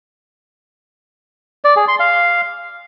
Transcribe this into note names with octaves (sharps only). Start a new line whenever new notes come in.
D5
G#4
C6
F5